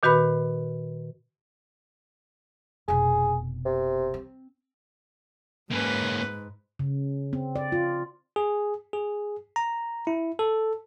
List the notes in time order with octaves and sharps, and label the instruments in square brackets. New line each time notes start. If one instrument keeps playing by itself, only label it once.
[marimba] A#2 D#3 F#4 B4 B5
[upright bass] F1 B2 [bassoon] G#4
[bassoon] C3
[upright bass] C4
[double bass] G#2 [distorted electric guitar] A#3 C#4 [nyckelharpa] B4
[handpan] C#3
C4
D5
F4
[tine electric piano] G#4
G#4
A#5
E4
A4